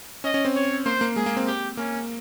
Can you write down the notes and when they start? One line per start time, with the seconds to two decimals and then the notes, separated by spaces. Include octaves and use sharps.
0.24 C#4 D#5
0.34 C#4
0.45 C4
0.55 C#5
0.85 A#3 C5
1.01 A#3
1.16 G#3 G#4
1.26 A#3
1.37 C4
1.47 G4
1.77 A#3 C#4